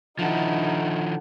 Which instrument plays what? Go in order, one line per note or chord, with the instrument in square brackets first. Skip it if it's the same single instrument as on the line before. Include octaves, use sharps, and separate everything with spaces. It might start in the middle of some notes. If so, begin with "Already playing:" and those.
[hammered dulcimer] D3 F#5 [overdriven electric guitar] D#3 F3 [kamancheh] D#4 E4